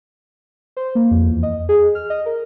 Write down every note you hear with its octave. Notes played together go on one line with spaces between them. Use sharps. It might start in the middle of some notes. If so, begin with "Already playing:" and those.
C5
A#3
F2
E2
D#5
G#4
F6
D#5
A#4